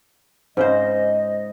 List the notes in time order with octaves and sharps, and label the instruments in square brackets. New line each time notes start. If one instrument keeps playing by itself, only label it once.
[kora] G#2 C#3 C5 [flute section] D#5